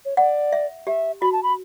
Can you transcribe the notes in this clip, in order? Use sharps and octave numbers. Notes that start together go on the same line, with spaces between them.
C#5
D5 F#5
E5
G4 E5
F#4 B5
A5
B5